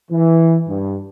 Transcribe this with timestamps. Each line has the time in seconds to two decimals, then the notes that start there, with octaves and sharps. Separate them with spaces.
0.11 E3
0.68 G2